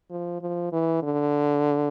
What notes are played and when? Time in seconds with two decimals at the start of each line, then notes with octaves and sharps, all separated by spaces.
0.11 F3
0.41 F3
0.72 E3
1.03 D3